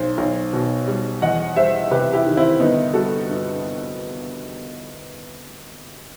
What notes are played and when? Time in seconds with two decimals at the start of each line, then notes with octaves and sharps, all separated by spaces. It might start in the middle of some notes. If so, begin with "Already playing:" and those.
Already playing: B1 C5
0.18 B1
0.53 B2
0.88 G3
1.22 E2 D#5 F#5
1.56 G3 C5 E5
1.91 C3 G4 B4
2.13 E4 G4
2.26 D#3
2.37 C4 E4
2.60 G1 B3 D#4
2.94 G3 F#4 A4
3.29 G2